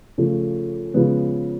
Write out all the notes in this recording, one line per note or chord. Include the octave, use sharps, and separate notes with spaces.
C#3 F3 A3
C#3 F3 G#3 B3